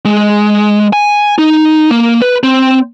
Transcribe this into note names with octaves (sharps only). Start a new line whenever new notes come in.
G#3
G#5
D#4
A#3
B4
C4